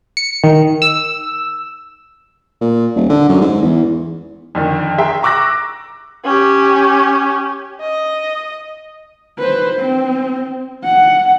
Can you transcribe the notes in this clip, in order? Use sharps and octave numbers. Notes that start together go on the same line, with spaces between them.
C#7
D#3
E6
A#2
D#1
D3
F#2
G#2
E2
F2 D3 D#3
G#4 E5 G5 A#5 C6
A#5 C#6 D6 E6 F#6 A#6
C#4 G4
D#5
B4 C5
C4
F#5